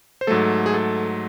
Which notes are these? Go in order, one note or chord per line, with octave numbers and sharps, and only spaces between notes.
C5
G#2 F#3 A3 A4
G#4
A4